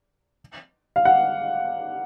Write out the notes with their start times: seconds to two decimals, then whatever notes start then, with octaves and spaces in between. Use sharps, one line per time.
0.96 F5
1.05 F#5